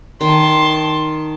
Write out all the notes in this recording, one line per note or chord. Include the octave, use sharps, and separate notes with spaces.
D#3 A5 C6